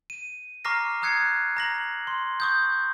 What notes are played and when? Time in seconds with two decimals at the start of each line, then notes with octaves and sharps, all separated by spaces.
0.10 D#7
0.65 A#5 C#6 D6 F6 A#6 C7
1.02 A#5 D#6 F#6 G#6 C7 C#7
1.57 A#5 A#6 F#7
2.07 C6
2.40 C#6 D#6 G6